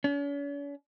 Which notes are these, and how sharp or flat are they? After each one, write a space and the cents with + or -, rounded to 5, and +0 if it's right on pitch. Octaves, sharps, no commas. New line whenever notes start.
C#4 +45